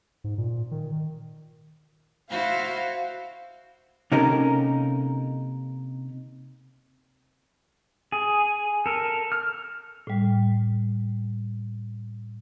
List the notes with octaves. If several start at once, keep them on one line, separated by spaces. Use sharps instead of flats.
G#2
A#2
D#3
E4 F#4 C5 F5
C3 A#3 C#4 D#4 A4 A#4
G#4
A4 A#4
F6
A2 G3